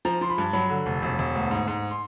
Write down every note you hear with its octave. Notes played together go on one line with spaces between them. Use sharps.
F3 A#5
F3 C6
B5
G2
F#3 B5
D3
F1
E1
E1
D2
G#2
G#2
C6